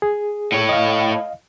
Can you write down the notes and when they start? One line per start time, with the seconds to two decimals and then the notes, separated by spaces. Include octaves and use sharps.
0.02 G#4
0.52 A2 C#5
0.69 D#5 F5